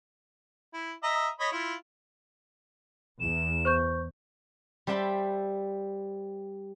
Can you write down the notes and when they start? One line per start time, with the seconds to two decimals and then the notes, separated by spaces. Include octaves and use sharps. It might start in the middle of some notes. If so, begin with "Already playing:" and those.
0.74 E4
1.03 D#5 E5 A#5
1.40 C#5 D#5 B5
1.52 E4 F4
3.20 E2 E7
3.65 C5 C#6 G6
4.87 G3 C5 E5 G5 A5 B5